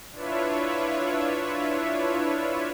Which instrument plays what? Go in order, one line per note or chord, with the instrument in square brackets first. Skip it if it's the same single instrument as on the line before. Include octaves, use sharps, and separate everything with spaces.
[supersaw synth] D4 E4 F4 B4 C#5 E5